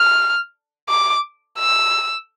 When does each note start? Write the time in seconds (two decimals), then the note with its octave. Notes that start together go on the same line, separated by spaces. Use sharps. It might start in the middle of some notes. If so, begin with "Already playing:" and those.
Already playing: F6
0.89 D6
1.59 E6